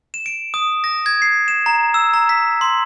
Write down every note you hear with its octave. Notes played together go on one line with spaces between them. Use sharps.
E7
D7
D#6
A#6
G#6
C7
E7
A#5
E6
A#5
B6
C6